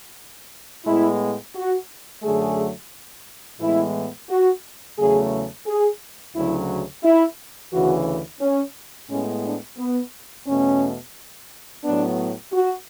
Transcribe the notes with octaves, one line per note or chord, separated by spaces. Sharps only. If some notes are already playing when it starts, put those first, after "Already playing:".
A2 G#3 B3 E4
F#4
F#2 D3 F#3 A3 G#4
A2 E3 G#3 B3 E4
F#4
E2 C#3 F#3 A3 G#4
G#4
D2 C#3 F#3 E4
E4
D2 C#3 E3 F#4
C#4
A2 G#3 B3 C#4
D4
B3
E2 B2 A3 C#4
A2 F#3 B3 D4
F#4